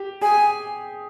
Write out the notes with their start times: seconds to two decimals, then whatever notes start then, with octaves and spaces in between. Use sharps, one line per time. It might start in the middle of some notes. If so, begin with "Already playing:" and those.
Already playing: G4
0.21 G#4 G#5